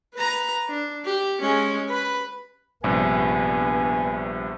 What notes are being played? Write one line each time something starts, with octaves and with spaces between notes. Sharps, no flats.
B4 A#5
D4
G4
G#3 C#4
B4 B5
A#1 G2 C3 B3 G#5